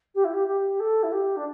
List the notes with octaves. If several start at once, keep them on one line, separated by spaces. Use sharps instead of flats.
G4
E4
G4
G4
A4
E4
G4
D4